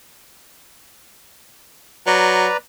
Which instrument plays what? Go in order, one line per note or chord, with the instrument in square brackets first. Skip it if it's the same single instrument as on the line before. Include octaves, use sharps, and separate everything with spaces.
[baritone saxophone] F#3 [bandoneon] B4 D5 A#5